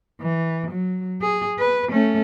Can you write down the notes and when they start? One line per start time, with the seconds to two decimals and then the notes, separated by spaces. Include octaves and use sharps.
0.21 E3
0.71 F#3
1.22 G#4
1.59 B4
1.92 A3 C#4